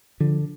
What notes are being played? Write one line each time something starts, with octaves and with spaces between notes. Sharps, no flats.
D3 F3